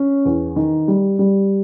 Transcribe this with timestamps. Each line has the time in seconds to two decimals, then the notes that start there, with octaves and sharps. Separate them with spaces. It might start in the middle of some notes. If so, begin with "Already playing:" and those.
Already playing: C#4
0.25 E2
0.56 D#3
0.88 G3
1.19 G3